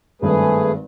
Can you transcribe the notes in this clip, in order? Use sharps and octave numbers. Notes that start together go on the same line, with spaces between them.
G#1 G2 A3 G#4 B4